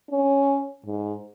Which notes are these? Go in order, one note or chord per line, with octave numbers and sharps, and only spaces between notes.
C#4
G#2